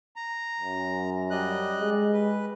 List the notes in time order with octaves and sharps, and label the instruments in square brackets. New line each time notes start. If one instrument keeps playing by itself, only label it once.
[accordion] A#5
[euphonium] F#2
[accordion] G3 D#5 F#6
[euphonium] G#3
[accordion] B4